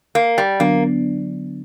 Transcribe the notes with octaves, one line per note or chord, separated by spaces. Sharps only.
A#3
G3
D3 F#3 A#3 B3 D4